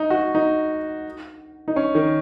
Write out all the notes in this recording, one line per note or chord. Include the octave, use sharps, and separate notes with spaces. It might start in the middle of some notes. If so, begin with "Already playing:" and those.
Already playing: D#4
F#4
D#4
D#4
C#4
D#3